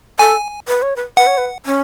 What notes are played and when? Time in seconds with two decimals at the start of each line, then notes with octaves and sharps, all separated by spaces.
0.19 A4 G#5
0.68 B4
0.82 C#5
0.96 B4
1.17 B4 F#5
1.27 C#5
1.38 B4
1.66 C#4